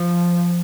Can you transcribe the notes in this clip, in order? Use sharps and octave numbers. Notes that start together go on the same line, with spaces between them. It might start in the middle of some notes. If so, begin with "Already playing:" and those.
Already playing: F3